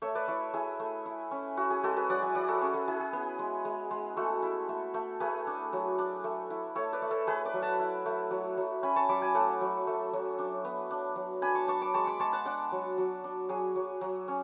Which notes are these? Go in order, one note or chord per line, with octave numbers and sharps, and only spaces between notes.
A3 C#5 E5
B4 D5
E4 A4 C#5
E4 G#4
A3
E4
C#4
E4 F#4
G#4
G#3 F#4 A4
G#4 B4
F#3 D5 F#5
E5 G#5
E4 D5 F#5
F#4 A4
C#4 G#4
F#4 A4
E4 G#4
G#4
B3
G#3
G#3
G#3
A3 F#4 A4
E4
A3
A3
A3 G#4 B4
D4
F#3
D4
A3
E4
A3 A4 C#5
B4 D5
A3
A4 C#5
A3 G#4 B4
B4 D5
F#3
F#5 A5
E4
A3
F#3
F#3
C#4 G#5 B5
A5 C#6
F#3 B5 D6
G#5 B5
A3 F#5 A5
F#3
A3
F#3
D4
B3
D4
F#3
D4 G#5 B5
A5 C#6
D4 A5 C#6
B5 D6
G#3 A5 C#6
B5 D6
G#3 A5 C#6
F#5 A5
D4 D5 F#5
F#3
F#3
D4
F#3 G#4
F#3
F#3
C#4